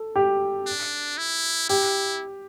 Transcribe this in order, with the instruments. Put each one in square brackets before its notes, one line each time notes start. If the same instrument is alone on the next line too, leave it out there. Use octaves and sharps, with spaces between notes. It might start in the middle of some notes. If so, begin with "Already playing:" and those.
Already playing: [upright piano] A4
G4
[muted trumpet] D4
E4
[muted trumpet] E4 [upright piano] G4